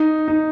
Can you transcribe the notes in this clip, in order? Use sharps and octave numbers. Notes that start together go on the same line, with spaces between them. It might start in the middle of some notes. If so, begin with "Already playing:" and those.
Already playing: D#4
D#4